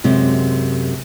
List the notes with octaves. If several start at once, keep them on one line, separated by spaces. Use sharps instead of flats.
F#2 C3 G#3